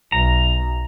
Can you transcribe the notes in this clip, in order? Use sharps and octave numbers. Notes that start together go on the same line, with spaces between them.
B1 A#5